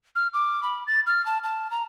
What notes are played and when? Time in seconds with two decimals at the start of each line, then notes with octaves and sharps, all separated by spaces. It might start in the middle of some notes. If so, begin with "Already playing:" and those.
0.16 F6
0.34 D6
0.63 B5
0.87 A6
1.07 F6
1.26 A5
1.44 A5
1.71 A#5